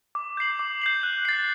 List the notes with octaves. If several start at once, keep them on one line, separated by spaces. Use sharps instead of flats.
D6
G6 C7 F#7
D6
G6 C7 F#7
F#6
A6 C7